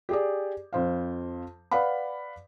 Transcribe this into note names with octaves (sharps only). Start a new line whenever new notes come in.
G4 G#4 D5
F2 C5 F5
B4 D5 F5 F#5 B5